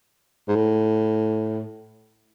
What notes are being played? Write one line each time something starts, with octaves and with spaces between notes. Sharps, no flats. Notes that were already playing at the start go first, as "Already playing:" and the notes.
G#2
A2